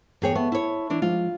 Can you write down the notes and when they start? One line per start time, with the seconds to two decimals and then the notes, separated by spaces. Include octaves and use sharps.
0.22 E2 G2 G#4 C#5 G5
0.35 B3 E5 A5 C#6
0.52 E4 C#5
0.90 E3 D4
1.02 F3 G#3 F4